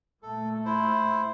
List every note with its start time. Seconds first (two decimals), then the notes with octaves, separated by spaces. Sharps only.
0.23 A#2 A3 A4
0.65 E4 C5